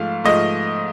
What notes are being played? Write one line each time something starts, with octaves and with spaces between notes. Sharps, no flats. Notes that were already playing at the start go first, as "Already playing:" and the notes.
Already playing: G#2 F3 A3 F5
G#2 F3 A3 D#5